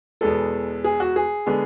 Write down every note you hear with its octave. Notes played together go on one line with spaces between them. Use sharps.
E2 B2 G#3 B3 A4
G#4
F#4
G#4
D3 G#3 B3